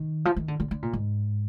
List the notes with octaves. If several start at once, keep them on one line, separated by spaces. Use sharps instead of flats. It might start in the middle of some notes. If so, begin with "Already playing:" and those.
Already playing: D#3
F3
D#3
D3
D3
D3
A#2
G#2